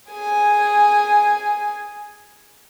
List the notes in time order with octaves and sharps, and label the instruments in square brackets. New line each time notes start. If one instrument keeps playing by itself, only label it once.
[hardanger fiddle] G#4 G#5